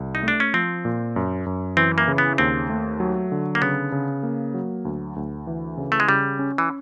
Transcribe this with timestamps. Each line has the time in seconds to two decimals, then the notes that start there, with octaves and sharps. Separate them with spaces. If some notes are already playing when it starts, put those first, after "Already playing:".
Already playing: C2
0.15 D#4
0.23 A3 D4
0.40 C#4
0.54 F3 C4
0.85 A#2
1.16 F#2
1.46 F#2
1.77 E3 C4
1.98 A#3
2.08 C#3
2.18 B3
2.38 D#2 C4
2.69 A3
3.00 F#3
3.32 D3
3.55 A#3
3.62 C#3 B3
3.92 C#3
4.23 A#3
4.54 F#3
4.85 D2
5.16 D2
5.47 E3
5.77 C#3
5.92 A3
6.00 G#3
6.08 C#3 G3
6.39 C#4
6.58 E3